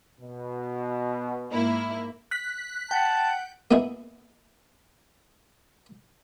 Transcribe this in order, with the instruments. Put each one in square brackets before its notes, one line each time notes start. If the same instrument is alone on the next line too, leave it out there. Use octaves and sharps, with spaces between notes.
[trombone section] B2
[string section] G#2 A#3 E4
[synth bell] F#6 B6
[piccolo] F#5 [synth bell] G5 [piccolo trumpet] A5
[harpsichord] A#3 B3 D#4 E4 G#4